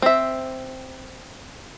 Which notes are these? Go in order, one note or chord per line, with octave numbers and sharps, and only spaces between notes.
C4 E5